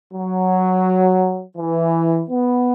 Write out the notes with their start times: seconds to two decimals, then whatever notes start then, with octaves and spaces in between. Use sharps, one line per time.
0.13 F#3
1.57 E3
2.30 B3